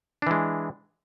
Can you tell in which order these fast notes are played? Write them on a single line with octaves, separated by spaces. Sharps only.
D4 E3 G#3